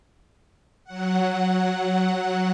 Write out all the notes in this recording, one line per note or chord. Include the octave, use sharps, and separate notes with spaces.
F#3 F#5